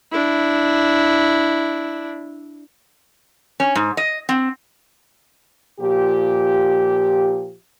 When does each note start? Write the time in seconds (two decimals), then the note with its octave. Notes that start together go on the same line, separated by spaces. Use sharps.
0.12 D4 E4
3.60 C#4
3.75 G#2
3.97 D#5
4.29 C4
5.80 A#2 F3 G4